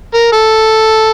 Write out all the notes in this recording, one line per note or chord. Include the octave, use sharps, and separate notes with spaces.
A#4
A4